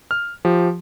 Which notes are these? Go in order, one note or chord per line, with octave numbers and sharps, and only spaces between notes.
F6
F3 G4